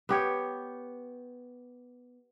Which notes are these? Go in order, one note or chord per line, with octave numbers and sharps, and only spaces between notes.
B3 G4 C#5